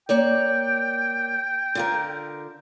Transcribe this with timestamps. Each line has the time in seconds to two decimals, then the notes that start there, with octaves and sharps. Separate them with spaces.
0.09 A#3 C#5 D5 G5
1.75 D3 F4 A#4